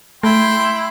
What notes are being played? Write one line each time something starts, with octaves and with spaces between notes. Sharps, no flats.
A3 E4 G5 C6